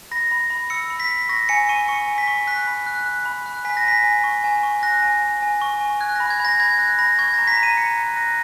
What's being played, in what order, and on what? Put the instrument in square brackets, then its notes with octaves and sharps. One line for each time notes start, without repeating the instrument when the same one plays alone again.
[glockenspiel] B5 A#6
B5
B5
E6 C#7
B5
B6
E6
B6
C#6 A#6
G#5 C#7
C#6 D#7
C#6 C#7
G#5
B6
C#6
F#6 B6
B5
F#6
F#6
B5
F#6
G#5 B6
A#6
G#5 B6
G#5
C#6
G#5
C#6
F#6 A#6
G#5
G#5
G#5
C#6
G#5
F#6 G#6
A#6
B5
G#6
B5 A#6
B5 G#6
F#6 A#6
B5 A#6
C#6 G#6
A#6
A#5
B6
A#5
D#7
A#5 C#7
F#6
F#6 A#6